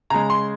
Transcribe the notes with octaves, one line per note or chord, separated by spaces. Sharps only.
C#3 G#3 A#5
C6